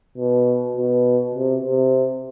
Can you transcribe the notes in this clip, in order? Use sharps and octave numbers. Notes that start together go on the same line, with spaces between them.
B2
B2
C3
C3